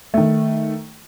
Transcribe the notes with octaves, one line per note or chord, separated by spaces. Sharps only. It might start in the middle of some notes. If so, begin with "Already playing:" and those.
D#3 A3